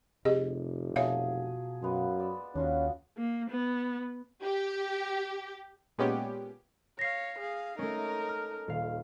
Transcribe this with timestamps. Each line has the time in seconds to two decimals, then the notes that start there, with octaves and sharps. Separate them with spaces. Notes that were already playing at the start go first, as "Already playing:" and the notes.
0.25 F1 C3 G4 G#4 D#5
0.96 B2 F3 F#3 G#4 C#5 E5 F5
1.82 F#2 G#3 A#3 B3
2.20 D5 E6
2.56 D#2 C#4 D4 F4 F#4
3.17 A#3
3.50 B3
4.42 G4
5.98 A#2 G#3 B3 C#4 G4
6.99 C#5 F5 A#6 C7
7.39 G#4 F5
7.79 A3 C#4 D#4 A#4
8.29 F6
8.68 D#1 F5